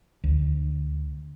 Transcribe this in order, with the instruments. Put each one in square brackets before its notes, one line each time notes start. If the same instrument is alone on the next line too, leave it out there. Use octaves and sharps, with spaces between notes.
[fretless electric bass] D2